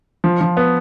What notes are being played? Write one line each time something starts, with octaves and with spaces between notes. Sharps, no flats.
F3
F3
B3